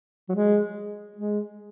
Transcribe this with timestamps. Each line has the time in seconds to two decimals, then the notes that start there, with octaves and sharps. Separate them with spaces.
0.29 F#3
0.35 G#3
1.16 G#3